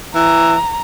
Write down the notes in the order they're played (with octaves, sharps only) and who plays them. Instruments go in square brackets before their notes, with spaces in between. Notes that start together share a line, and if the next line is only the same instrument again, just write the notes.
[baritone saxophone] E3 [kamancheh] A#5